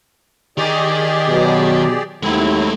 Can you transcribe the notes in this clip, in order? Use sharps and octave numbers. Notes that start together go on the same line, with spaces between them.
D#3 D#4 G4 G#4 D5
B2 F#3
D#2 F#3 G#3 A3 C4 E4